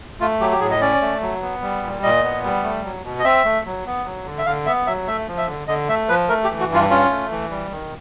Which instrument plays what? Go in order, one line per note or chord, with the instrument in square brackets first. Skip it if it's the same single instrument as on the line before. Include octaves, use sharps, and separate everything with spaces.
[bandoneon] A3 F4
F#3 G4
G4
A2 G#4
D#5
C#4 D5
A3
F#3
B3
G3
A#2
A#2 D#5
B3
G3
A3
F#3
B2
D#5
C4 E5
A3
F#3
B3
F#3
D3
E5
D3 F5
B3 E5
F#3 E5
A3 E5
F3
E5
D3
D3 D#5
A3 E5
F3 B4
A3 A#4
G4
E3
F#4
G2
F4
C#4 F4
A3
E3
G3
D#3